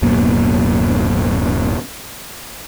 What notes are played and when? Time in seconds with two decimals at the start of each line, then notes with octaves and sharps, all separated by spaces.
0.02 D1 F#2 B2 A#3